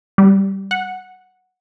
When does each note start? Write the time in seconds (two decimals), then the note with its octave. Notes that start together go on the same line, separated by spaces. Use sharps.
0.18 G3
0.71 F#5